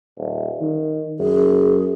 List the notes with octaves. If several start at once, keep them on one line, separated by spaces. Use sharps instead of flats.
D#1
D#3
F#2 G#4